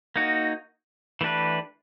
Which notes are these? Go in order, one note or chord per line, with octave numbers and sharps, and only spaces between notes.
A#3 D#4 F#4
E3 A3 D4 G4 B4